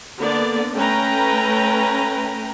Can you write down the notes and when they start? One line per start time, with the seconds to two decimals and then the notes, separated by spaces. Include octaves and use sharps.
0.17 D3 A#3 B3 D5
0.74 A3 C#4 B4 G5 A#5